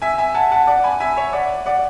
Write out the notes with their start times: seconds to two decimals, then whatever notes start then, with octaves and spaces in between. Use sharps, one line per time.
0.02 E5 G#5
0.18 E5 G#5
0.34 F#5 A5
0.52 F#5 A5
0.67 D5 F#5
0.84 G#5 B5
1.00 E5 G#5
1.16 C#5 E5
1.33 D5 F#5
1.66 D5 F#5